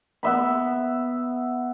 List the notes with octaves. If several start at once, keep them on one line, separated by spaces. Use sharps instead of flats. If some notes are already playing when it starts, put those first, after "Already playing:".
B3 E5 B5